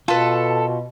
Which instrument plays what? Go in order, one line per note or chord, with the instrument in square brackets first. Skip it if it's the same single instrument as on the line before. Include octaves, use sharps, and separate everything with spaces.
[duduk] B2 [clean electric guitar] F4 [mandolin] A4 B4